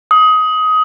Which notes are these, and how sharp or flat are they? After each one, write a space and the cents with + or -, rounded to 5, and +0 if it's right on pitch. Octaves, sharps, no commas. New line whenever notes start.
D#6 +20